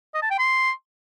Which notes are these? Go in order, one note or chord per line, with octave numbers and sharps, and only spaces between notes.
D#5
A5
G5
C6